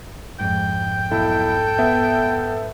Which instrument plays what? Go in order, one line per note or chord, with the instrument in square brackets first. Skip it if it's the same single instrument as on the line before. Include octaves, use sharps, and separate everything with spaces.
[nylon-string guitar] F2 G#2 [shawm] G5
[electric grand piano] B1 E4 [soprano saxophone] A4
[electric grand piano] B3 E5